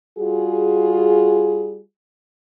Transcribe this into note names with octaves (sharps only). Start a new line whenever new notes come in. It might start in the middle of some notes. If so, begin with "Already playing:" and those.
G3 F4 F#4 G#4